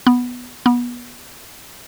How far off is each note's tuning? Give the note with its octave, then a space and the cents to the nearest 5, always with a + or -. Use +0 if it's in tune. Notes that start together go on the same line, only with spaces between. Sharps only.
B3 -5
B3 -25